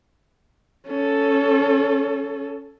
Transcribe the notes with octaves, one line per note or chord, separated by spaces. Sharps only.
C#4 A4